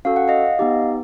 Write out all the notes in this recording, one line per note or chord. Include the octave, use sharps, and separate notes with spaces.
C#4 F#4 A4 F5
F#5
D#5 F5
B3 D#4 G4